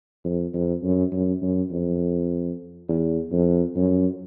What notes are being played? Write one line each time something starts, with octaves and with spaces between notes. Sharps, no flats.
F2
F2
F#2
F#2
F#2
F2
E2
F2
F#2